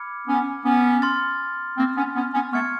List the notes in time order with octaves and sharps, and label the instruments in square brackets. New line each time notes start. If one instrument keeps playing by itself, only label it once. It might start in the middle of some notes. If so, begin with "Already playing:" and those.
Already playing: [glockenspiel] B5 D6 F6 G#6 C#7
[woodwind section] B3 C#4
B3 C#4
[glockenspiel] C6 F6 A6
[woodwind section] A#3 C4
B3 C#4
B3 C#4
B3 C#4
[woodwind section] A3 B3 [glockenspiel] C#6 F6 G#6 C#7